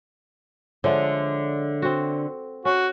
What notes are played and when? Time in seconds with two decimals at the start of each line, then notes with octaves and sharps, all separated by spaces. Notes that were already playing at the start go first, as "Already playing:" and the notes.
0.84 D3 F3 G#3 C#5 E5
1.82 C4 F#4
2.65 C#4 F#4